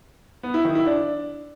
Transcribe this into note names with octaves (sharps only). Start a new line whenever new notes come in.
B3
E4
D#3
E4
D4